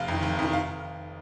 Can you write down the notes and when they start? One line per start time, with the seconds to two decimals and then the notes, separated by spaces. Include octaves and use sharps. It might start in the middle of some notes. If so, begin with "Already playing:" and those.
Already playing: F1 F5
0.08 F2 D#3
0.23 F1
0.39 F2 D#3
0.53 F5